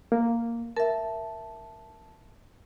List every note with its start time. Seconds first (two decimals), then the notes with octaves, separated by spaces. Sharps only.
0.12 A#3
0.77 A#4 E5 A5